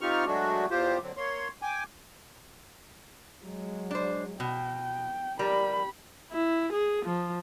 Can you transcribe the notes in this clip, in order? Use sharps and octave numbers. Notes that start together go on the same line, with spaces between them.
C4 D#4 F4 G4 C#6 F6
F#3 G#3 A3 D4 F#4
E2 F4 G4 C5
D3 F#3 C4
A#3 C#5 C6
G5 G#5 D6
F#3 G#3
D4 C5
B2 G5
G3 G4 A#4 B5
E4
G#4
F3